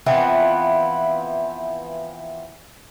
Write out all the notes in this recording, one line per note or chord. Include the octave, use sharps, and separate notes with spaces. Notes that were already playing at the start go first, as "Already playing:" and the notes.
E3 F3 B3 C4